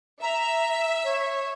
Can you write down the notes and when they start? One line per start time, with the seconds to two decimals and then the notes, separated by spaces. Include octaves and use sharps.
0.22 E5 A#5
1.04 C#5